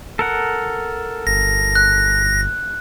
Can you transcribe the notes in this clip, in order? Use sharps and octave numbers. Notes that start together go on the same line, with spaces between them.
A4 A#4 F#5
G1 A#6
F#6